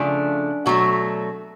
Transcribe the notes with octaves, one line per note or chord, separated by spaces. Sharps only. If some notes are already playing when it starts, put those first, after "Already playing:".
Already playing: C#3 F3 A3 D4
B2 F#3 A3